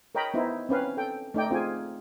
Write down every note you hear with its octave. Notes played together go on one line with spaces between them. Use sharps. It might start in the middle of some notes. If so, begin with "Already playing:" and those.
A#4 C#5 D#5 G5 A#5 B5
B3 D#4 E4 C5
C4 C#4 B4 F5
A4 G5
A3 D#4 D5 G5
C4 F4 G#4 G#5